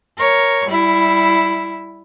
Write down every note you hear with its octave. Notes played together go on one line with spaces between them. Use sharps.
A#4 C#5
G3 E4